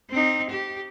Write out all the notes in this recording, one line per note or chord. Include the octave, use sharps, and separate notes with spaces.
C4 D#4
G4